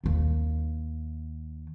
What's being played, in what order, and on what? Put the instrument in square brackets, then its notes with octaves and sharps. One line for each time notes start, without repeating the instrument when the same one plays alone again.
[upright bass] D#2 D#3